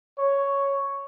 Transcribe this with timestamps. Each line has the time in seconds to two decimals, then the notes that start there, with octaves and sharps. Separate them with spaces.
0.19 C#5